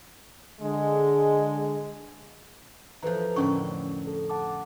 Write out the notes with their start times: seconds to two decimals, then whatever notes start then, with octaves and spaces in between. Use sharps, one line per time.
0.61 D3 G#3
3.03 E3 F3 A4 B4 A#5
3.36 F2 A2 D3 C#4 A#4 C#6
4.07 A4
4.29 F#5 A5 D6